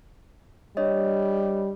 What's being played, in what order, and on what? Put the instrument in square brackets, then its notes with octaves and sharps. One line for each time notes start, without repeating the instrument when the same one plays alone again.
[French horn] G3 [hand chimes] D4 C#5 D#5